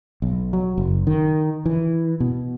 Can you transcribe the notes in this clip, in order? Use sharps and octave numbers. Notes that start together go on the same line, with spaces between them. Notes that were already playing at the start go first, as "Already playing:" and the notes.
B1
F#3
F#1
D#3
E3
B2